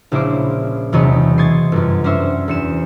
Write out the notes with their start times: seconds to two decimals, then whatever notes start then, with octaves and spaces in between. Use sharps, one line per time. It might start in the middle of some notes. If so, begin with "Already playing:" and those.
0.12 A#1 C#3 E4 C5 D6 D7
0.92 E1 E2 C3 F#3 C#5 D#5
1.38 C6 C#6 D#6 G#6 A6 C7
1.72 G1 F#2
2.04 C#4 D4 F#4 C5 C#5 E5
2.48 E2 C#7 E7